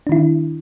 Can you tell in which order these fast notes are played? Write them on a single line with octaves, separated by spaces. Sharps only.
D4 D#3 E4